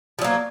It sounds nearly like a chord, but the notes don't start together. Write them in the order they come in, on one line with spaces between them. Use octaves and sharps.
F3 F#3 A#3